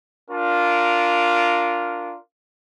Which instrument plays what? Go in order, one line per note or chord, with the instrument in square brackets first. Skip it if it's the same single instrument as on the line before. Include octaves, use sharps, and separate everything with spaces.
[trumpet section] D4 F4 A#4